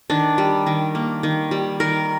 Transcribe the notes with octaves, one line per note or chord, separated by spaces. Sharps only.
D#3 D4
G3
D#3
A#3
D#3
G3
D#3 A#4